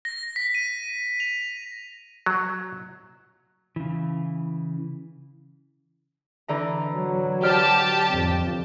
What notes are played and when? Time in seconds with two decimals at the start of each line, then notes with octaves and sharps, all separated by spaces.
0.05 A#6
0.36 B6
0.55 D#7
1.20 F7
2.26 F#3
3.76 C#3 E3
6.48 D3 E3 A#5
6.92 F#3
7.43 G4 C5 D5 A5 F6
8.10 F2